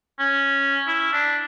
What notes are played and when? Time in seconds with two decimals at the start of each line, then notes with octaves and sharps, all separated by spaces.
0.19 C#4
0.87 E4
1.13 D4